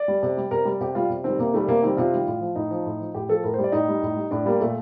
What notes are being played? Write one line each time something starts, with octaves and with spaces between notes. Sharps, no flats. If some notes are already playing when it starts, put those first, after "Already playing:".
Already playing: D5
G3
C3
G3
C3 A#4
G3
C3 G4
G3 F4
C3
D#3 G3 C4
C3 A#3
D#3 G3 A3
C3 A#3
D#3 G3 C4
C3 F4
D#3 G3
A2
F3
A2 D#4
F3
A2
F3
A2 G4
F3 A4
A2 A#4
C5
G3
D5
A2 D#4
G3
A2
G3
A2 D4
G3 A#3
A#2 A3